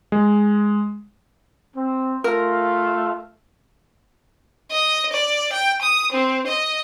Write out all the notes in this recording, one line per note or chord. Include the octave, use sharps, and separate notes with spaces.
G#3
C4
A3 F4 A#4 F5
D#5
D5
G5
D#6
C4
D#5